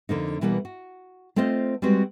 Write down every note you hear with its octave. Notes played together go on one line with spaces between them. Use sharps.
F2 D3 A#3 D#4
B2 E3 G3 A#3 B3
F#4
A3 C4 F4 C5 D#5 F5
G3 G#3 C4 F#4 B4